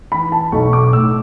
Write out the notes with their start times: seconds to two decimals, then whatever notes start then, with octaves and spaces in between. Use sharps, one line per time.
0.12 E3 B5
0.32 A5
0.52 B1 C#6
0.73 D6
0.93 A2 E6